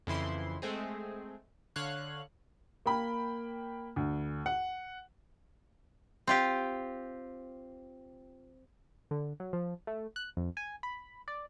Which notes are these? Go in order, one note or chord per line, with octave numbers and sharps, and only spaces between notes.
F2 C#3 E3 E4 C6
G#3 A3 C4 G#4
D3 C#5 F5 F#6
A#3 G5 B5
D2
F#5
C4 F4 G4
D3
F#3
F3
A3
F#6
F2
G#5
B5
D5